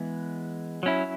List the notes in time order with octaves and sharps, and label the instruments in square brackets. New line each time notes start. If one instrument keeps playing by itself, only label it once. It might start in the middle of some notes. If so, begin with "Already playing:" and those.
Already playing: [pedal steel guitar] E3 G#3 B3
F#3 C#4 E4